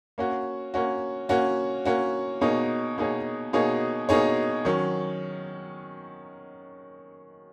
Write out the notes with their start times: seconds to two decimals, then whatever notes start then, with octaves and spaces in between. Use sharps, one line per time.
0.18 A#3 C#4 F#4
0.74 A#3 C#4 F#4
1.29 A#3 C#4 F#4
1.85 A#3 C#4 F#4
2.41 B2 A#3 D#4 G#4 C#5
2.98 B2 A#3 D#4 G#4 C#5
3.53 B2 A#3 D#4 G#4 C#5
4.09 B2 A#3 D#4 G#4 C#5
4.65 D#3 F#3 C#4